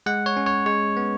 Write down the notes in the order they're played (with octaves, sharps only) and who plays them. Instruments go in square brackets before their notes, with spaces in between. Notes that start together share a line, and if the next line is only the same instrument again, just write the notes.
[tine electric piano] G#3 F#5
C#5
C#4
C#5
G#3 C#5
B3